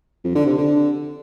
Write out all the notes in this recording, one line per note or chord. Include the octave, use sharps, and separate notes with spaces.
F2
D3
C3
D3